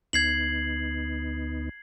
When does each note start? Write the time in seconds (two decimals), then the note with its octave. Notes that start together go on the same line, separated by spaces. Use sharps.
0.13 D2 B3 D#4 G#6 C7 F#7